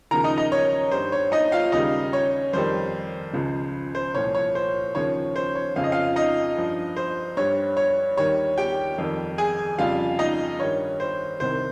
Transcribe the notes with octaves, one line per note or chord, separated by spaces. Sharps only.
D#2 C#3 F3 A#4 A#5
D#4 D#5
D#4 D#5
C#5
G2 G3 C5
C#5
D#4 D#5
F4 F5
D#2 C#3 G3 D#4 D#5
C#5
F2 D#3 G3 C5
C#2 C#3 F3
C5
C2 A#2 F3 C#5
C#5
C5
D#2 C#3 F3 C#5
C5
C#5
F2 C#3 F3 F5
D#5
F4 F5
D#4 D#5
G2 F3
C5
G2 G3 C#5
C#5
D#2 D#3 G3 C#5
G4 G5
F2 D#3 G3
G#4 G#5
F2 C#3 G3 F4 F5
D#4 D#5
G2 D#3 G3 C#5
C5
C2 C3 D#3 C5